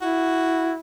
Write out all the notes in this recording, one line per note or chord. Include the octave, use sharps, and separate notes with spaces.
E4 F#4